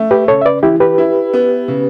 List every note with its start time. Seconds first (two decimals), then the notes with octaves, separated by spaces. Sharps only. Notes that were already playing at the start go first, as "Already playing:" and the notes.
Already playing: A3
0.11 G4 B4
0.28 C#3 A4 C#5
0.41 E5
0.45 B4 D5
0.63 E3 E4 G4
0.80 G4 B4
0.98 E4
1.33 B3
1.68 C#3